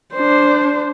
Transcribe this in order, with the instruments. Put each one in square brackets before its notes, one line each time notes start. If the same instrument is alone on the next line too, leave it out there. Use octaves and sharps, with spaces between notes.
[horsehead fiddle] D4 C5